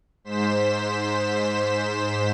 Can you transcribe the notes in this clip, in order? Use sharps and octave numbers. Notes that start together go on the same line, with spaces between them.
G#2 C5 B6 E7